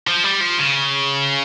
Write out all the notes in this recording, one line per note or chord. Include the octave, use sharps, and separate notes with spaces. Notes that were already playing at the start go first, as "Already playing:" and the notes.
F3
G3
F3
C#3